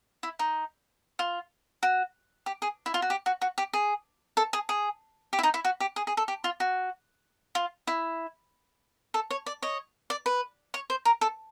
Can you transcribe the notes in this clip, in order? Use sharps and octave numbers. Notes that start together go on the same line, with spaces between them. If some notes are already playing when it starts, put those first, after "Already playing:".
E4
D#4
F4
F#4
G4
G#4
E4
F4
F#4
G4
F#4
F#4
G4
G#4
A4
G#4
G#4
G4
E4
D#4
E4
F#4
G4
G#4
G#4
A4
G4
F4
F#4
F4
E4
A4
C#5
D5
C#5 D#5
D5
B4
C#5
C5
A#4
A4